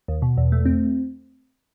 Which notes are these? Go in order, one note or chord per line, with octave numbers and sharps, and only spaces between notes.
D#2
B2
E2
A3
C4